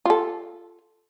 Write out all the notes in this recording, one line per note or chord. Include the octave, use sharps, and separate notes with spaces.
F4 A4